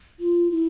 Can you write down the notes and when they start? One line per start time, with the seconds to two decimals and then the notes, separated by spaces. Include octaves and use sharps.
0.20 F4
0.51 E4